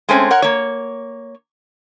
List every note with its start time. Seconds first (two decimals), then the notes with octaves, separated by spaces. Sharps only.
0.09 G#3 A3 C4 C#4
0.31 A#4 C#5 F#5
0.42 A#3 C#5